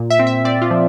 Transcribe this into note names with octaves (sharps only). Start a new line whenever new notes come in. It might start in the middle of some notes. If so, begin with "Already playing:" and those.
Already playing: A#2
E5
C4
E5
C4 D5
F4
F3